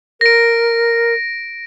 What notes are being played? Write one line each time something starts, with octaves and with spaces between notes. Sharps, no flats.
A#4 A#6 D7